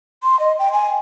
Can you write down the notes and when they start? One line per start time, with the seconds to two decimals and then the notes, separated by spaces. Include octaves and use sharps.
0.23 C6
0.39 D#5
0.59 G5
0.72 G#5